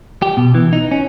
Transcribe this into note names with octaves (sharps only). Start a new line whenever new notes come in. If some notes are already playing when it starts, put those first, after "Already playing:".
G4
B2
E3
D#4
C#4